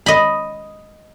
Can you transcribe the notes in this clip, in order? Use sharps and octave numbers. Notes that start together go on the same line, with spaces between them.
D#5 B5